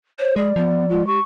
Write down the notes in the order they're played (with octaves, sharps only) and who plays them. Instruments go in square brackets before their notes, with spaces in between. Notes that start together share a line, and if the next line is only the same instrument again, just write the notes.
[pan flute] C5 [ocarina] C#5
[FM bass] G#3 [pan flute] G#4 [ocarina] D5
[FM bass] F3 [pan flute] B3
[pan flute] G#3 [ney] F4
[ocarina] G4 [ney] C#6